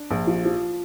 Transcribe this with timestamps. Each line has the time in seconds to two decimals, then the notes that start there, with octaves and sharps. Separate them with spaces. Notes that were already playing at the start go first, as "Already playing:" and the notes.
Already playing: D4
0.11 A#1
0.27 F3
0.45 F3